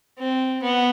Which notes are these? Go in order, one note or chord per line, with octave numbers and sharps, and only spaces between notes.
C4
B3